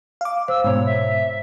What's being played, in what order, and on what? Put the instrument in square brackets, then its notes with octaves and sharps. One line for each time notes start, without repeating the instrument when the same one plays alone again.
[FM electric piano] F5 D6
[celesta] C5 [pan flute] E6
[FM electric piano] G#2 B2 [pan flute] C#5
[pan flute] E5